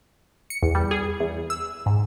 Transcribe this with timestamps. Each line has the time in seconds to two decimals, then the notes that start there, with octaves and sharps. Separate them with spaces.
0.50 C#7
0.63 E2
0.75 G3
0.91 G#4
1.20 E2
1.50 E6
1.86 G#2